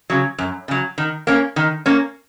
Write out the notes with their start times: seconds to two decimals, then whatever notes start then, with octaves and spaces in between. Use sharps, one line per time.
0.10 C#3 F#3
0.38 F#2
0.68 C#3 F#3
0.98 D#3
1.27 A#3 C#4
1.56 D#3
1.86 A#3 C#4